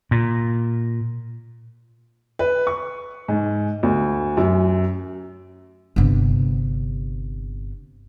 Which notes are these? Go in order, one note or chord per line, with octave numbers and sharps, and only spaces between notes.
A#2
B4
C#6
G#2
D2
F#2
G1 C3